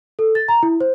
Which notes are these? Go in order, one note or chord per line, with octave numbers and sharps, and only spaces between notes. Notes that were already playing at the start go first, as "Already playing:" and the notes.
A4
A6
A#5
E4
C5